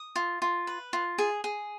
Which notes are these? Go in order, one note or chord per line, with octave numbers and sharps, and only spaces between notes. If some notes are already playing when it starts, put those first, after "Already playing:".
Already playing: D#6
F4
F4
B4
F4
G#4
G#4